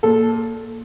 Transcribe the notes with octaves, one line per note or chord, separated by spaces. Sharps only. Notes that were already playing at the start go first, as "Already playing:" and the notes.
A#2 A4